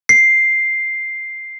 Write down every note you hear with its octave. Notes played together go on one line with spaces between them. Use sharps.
C7